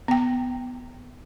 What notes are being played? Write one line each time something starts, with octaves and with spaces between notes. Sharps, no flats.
B3 G5